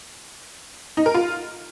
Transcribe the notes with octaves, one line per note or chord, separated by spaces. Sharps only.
D#4
A#4
F4